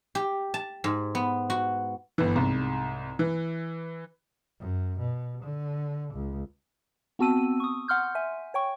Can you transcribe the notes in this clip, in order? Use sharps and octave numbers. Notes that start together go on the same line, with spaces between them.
G4
A5
G#2
B3
F#4
G1 E3
C2 G#2
E3
F#2
B2
D3
C#2
B3 C4 F#4 A5 E6 D#7
C#6 D#6
F#5 C6 F6 G6
E5 G#5
C#5 G5 C#6